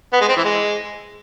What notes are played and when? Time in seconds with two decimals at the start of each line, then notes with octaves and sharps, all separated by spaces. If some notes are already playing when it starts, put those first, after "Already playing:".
0.13 B3
0.21 G#3
0.29 C4
0.37 E3
0.44 G#3